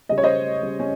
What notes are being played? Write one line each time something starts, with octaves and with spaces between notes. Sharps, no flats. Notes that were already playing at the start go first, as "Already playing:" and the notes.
C#3 G3 D#5
C#5
C5 D#5
C#3 G3
C#4